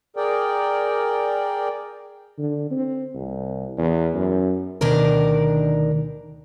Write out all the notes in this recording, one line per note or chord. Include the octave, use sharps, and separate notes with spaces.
G#4 A#4 D5 G5
D3
C4
C2
E2
F#2
D2 B2 D#3 D4 A#4 D5